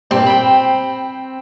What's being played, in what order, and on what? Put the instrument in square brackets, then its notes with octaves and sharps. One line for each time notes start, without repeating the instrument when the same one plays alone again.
[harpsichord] G2 A#2 [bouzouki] C4
[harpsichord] G5 B5